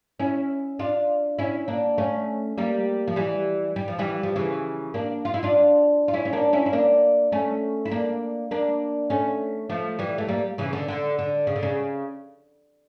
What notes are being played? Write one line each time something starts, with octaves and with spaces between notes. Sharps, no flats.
C#4 E4
D4 F4
C#4 E4
A#3 D4
A3 C#4
G3 A#3
F3
E3 G3
G3
F3
E3 G3
F3
C#3 E3
A#3 D4
F4
E4
D4 F4
F4
C#4 E4
C#4
A#3 D4
C#4 E4
E4
A#3 D4
A3 C#4
E4
A#3 D4
A#3 D4
A3 C#4
F3 A3
E3 G3
A3
G3 A#3
C#3 E3
D3
D3
D3
C#3
D3
C#3